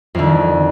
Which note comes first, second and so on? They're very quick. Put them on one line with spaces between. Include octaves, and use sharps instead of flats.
F2 D3 D#3